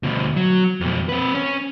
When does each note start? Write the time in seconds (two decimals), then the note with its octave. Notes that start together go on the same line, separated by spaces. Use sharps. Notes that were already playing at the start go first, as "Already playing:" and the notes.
0.03 D2 B2
0.36 F#3
0.81 F2 B2
1.09 C4 B4
1.35 C#4